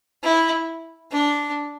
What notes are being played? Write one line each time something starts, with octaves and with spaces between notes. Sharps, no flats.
E4
D4